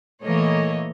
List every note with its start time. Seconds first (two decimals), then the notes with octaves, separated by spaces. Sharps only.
0.25 A#2 E3 A3 A#3 C#5 D#5